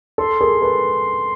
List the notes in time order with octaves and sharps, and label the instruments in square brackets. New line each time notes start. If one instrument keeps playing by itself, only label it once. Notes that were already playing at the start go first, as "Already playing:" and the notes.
[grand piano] A4 [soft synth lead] C6
[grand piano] G#4 A#4
A4 B4